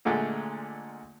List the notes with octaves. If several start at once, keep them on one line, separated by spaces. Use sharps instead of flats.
A#2 D3 G#3 A3